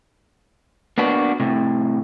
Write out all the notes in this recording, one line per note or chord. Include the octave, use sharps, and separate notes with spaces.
A#3 B3 D4 F#4 B4
A2 C3